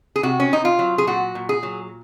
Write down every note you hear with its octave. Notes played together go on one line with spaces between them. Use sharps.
G#4
C3 F#4
C#4
C3 D#4
F4
F#3
G#4
A#2 F#4
A#2
G#4
F#3